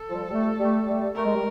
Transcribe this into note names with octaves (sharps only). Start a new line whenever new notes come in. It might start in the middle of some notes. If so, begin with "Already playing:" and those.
Already playing: A4
F3 G3
G3 A3
G3 A3
G3 A3
A3 A#4
G#3
G3